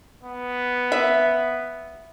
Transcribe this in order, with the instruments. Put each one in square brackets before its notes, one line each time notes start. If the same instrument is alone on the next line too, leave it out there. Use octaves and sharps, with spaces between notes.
[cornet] B3
[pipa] E5